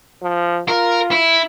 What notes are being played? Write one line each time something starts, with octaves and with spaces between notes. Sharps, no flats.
F3
F4 A#4
E4